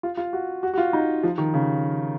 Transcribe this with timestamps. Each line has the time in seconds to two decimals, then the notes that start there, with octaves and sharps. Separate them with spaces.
0.03 F4
0.17 F4
0.33 F#4
0.63 F#4
0.74 F#4
0.78 F4
0.93 D#4
1.23 F3
1.38 D#3
1.54 C#3